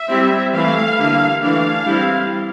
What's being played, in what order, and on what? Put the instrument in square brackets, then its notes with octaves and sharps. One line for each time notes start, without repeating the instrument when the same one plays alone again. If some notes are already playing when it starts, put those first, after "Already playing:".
Already playing: [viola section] E5
G3 C4 E4
E3 A3 E4 F5
D3 G3 A#3 E4
E3 A3 D4 F5
G3 C4 E4